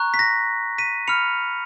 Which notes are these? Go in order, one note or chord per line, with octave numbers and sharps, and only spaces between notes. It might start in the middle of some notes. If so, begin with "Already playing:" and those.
Already playing: A#5 C#6 F#6
B6
A#6
B6 D#7
B5 F6 C#7 F7